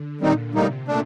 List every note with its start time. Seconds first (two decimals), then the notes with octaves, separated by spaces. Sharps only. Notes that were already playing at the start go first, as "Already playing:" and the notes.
Already playing: D3
0.20 A#2 D#3 G3 C4 D#4
0.54 A2 C3 G3 A#3 D#4
0.88 A#2 A3 D4